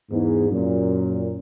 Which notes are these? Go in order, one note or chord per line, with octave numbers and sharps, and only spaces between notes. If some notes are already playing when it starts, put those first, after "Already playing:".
E2 G#2
F#2 A#2